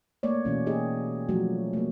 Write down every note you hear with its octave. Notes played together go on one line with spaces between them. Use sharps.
A3 A#3 C#5 D5
B2 E3 C#4
A#3 D#4 G4 G#4 D#5
F3 F#3 A3 F#4
A3 A#3